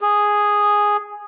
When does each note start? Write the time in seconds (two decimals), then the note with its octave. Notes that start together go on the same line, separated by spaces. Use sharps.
0.01 G#4